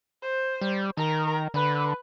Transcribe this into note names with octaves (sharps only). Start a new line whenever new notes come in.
C5
G3
D#3 A#4
D3 B4